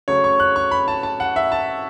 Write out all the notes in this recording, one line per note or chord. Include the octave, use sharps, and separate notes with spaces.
C#3 F#3 A3 C#5
C#6
F#6
C#6
B5
A5
A5
F#5
E5
A5